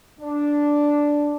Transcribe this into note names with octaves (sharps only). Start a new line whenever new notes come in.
D4